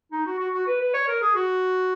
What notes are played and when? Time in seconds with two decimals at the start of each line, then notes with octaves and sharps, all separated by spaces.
0.12 D#4
0.26 F#4
0.39 F#4
0.54 F#4
0.67 B4
0.81 B4
0.94 C#5
1.08 A#4
1.22 G#4
1.35 F#4